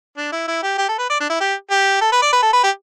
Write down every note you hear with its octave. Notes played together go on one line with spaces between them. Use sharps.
D4
E4
E4
G4
G4
A4
B4
D5
D4
E4
G4
G4
A4
B4
D5
B4
A4
B4
G4